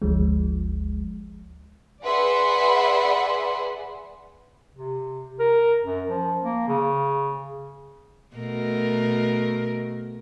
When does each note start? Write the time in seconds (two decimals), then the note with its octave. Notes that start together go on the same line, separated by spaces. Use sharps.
0.02 G1 D2 F3 G#3
2.03 G#4 B4 D5 E5 F#5 C6
4.75 C3
5.39 A#4
5.84 F#2
6.08 F3
6.44 A#3
6.68 C#3
8.35 B2 A3 A#4